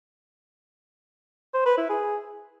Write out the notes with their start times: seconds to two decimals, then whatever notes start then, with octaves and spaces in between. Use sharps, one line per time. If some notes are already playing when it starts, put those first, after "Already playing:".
1.54 C5
1.66 B4
1.77 E4
1.89 G#4